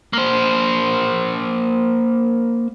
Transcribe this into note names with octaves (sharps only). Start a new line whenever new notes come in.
A#3 C5